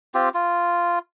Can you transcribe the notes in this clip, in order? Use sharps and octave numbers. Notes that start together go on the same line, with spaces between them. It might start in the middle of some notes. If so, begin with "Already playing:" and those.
C4 F4 G4
F4